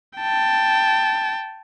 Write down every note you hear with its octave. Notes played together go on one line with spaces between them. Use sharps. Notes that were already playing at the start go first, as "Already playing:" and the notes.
G5 A5